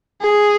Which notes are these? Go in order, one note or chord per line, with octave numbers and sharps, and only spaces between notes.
G#4